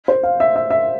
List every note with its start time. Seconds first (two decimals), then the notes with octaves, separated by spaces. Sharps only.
0.08 C5
0.23 F5
0.40 E5
0.56 E5
0.70 E5